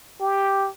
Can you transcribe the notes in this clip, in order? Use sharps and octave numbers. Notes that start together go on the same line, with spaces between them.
G4